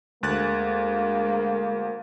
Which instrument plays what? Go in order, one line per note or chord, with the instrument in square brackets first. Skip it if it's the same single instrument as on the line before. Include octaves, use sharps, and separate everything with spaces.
[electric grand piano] D2 F#6 A6 [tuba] G#3 [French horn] A#3